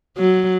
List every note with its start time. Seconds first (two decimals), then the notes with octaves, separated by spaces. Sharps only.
0.17 F#3